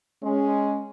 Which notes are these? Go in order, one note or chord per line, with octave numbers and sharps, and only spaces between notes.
G#3 C#4